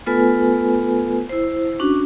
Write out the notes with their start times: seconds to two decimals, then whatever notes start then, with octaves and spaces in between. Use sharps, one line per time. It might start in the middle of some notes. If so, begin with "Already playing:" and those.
0.06 A3 B3 F4 A4 B4 G#5
1.29 E4 C5
1.80 C#4 D4 F#4